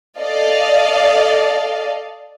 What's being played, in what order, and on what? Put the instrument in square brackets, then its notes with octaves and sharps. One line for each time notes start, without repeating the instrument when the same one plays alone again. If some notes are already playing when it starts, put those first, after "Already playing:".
[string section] A4 D5 D#5 F5